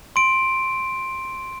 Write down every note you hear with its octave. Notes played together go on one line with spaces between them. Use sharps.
C6 D7